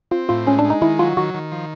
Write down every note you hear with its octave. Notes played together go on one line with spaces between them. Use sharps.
C4 F4
A2 F4
G#3 C#4
D4
G#3
D#4
D#3 E4
F#3 F4
D#3 F#4
D#3
F3